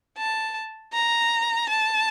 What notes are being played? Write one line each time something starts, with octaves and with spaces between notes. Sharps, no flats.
A5
A#5
A5